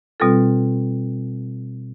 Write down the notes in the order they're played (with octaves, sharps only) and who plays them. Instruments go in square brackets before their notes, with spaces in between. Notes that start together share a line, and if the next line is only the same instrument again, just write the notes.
[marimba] B2 G3 C4 F4 A4